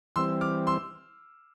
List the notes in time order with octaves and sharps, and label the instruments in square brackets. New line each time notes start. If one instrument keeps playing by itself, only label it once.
[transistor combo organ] E3 G3 C4 [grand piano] C6 E6
[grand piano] D6 F6
C6 E6